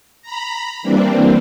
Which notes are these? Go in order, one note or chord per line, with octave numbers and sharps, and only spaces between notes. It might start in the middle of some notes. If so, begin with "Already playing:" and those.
A#5 B5
E3 G3 A#3 C4 D4